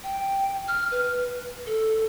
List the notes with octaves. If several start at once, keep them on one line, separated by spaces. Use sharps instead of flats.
G5
F6
B4
A4